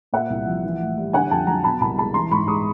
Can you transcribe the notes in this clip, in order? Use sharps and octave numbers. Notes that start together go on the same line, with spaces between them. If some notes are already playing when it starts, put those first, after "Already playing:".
A#2 E5 F#5
C2
F3
E3
A2
G3
D3 F#5 G#5
F2 G5 A5
F#3 G#5 A#5
B2 A5 B5
C2 A5 B5
G#3 A5 B5
E3 A#5 C6
G#2 B5 C#6
G#3 C#6 D#6